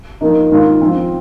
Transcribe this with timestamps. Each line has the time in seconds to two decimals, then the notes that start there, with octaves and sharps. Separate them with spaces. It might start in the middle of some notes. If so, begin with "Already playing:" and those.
0.21 F3 A#3 D#4
0.50 G#2 D#3 A#3 F4
0.80 F3 C4 F4